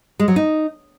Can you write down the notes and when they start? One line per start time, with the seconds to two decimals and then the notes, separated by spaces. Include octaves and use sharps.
0.20 G#3
0.28 F#3
0.36 D#4